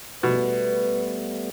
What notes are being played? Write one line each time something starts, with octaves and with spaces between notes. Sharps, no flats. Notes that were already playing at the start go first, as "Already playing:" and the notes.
B2 G3 A3 B3 B4